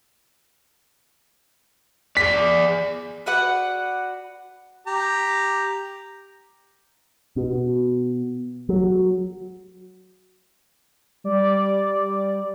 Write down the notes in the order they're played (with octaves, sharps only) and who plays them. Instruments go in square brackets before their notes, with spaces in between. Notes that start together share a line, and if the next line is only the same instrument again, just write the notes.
[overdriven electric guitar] G#4 D5 [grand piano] B6
[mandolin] F#4 B4 D5 F#5
[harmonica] G4 A#5
[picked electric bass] B2
F#3
[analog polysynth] G3 D5